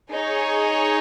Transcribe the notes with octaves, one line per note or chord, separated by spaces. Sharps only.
D#4 G#4 C#5